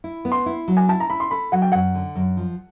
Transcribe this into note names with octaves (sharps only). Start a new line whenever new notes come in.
E4
B3
C6
E4
F#3
G#5
E4 A5
A#5
E4 B5
C6
A4 B5
F#3 F#5
G5
F#2 F#5
D3
F#2
F3